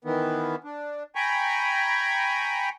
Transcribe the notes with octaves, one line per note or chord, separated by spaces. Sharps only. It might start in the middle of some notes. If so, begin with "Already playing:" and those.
D#3 E3 B3
D4
G5 G#5 A#5 B5 C#6